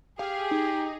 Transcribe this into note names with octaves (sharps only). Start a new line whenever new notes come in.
G4 G#4 F5
D#4